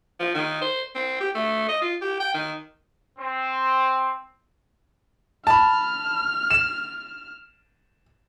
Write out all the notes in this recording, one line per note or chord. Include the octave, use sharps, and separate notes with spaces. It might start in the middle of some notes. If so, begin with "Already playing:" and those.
F3
D#3
C5
C4
G4
A3
D#5
F4
G4
G5
D#3
C4
A5 B5 F6
E7